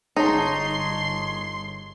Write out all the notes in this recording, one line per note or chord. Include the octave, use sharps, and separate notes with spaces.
G1 D#4 G#4 C#5 A5 C6